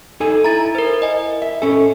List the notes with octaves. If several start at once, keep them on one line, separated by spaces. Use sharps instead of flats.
D#4 A4 G#5
E4 A#5 A6
A#4 C5
D#5 G#5
E5
C#4 A4 G#5